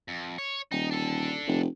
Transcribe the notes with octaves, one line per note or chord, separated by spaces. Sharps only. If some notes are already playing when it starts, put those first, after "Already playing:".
F2
C#5
D#1 D#4
D4 A4
F1